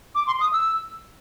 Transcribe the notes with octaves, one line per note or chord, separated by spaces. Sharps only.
D6
C6
D#6
E6